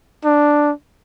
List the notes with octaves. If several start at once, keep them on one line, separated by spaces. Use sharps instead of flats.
D4